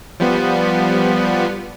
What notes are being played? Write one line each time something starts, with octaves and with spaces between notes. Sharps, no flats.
F3 G3 B3